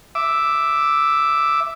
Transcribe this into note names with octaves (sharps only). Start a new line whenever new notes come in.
E5 D6